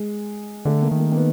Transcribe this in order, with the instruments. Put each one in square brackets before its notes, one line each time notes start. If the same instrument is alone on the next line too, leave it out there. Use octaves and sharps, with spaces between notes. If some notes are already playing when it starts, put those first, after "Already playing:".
Already playing: [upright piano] G#3
[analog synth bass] D3 [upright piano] A3
[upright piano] A#3
[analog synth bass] D#3
[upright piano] A#3
A#3
B3